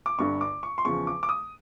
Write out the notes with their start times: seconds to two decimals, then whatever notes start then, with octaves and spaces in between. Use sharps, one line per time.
0.06 D6
0.18 G1 G2 D3 C#6
0.41 D6
0.63 C#6
0.78 C6
0.85 E2 C#3 F3 C#6
1.07 D6
1.23 D6
1.29 D#6